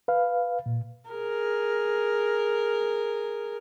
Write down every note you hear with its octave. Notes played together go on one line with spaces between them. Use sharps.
B4 F5
A#2
G#4 A#4